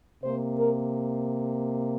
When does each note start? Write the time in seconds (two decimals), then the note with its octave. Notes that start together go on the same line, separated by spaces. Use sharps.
0.23 C3 A#3 C5
0.59 A#4